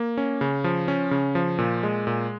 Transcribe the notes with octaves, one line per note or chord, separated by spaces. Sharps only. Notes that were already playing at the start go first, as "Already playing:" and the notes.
Already playing: A#3
C#4
C#3
F3
C#4
C#3
F3
A#2
G#3
A#2